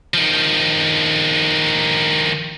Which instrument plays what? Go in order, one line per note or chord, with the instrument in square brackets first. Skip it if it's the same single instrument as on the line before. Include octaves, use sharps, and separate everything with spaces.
[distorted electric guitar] D#3 F3